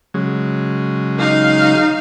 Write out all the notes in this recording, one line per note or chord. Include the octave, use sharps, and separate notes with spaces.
C#3 F#3 G#3
D#4 F5